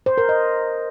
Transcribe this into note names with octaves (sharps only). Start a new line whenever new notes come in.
C5
A#4
D#5